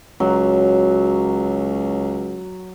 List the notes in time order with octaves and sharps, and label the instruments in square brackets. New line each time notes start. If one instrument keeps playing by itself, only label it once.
[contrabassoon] C#2 [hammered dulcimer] F#3